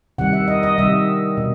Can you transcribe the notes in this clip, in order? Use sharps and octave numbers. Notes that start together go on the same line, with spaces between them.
C3 D#3 G3 F#5
E5
D#5
D#5
C3 D#3 G3 E5
B2